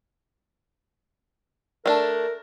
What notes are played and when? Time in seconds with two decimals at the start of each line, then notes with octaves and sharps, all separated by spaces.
1.86 A3 D4 A#4